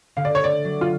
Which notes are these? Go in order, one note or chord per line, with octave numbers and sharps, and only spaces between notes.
D3 F5
D5
C#5
A3 D5
F#3
F4